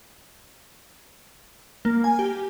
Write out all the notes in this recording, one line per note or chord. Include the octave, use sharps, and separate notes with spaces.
A#3
G#5
G4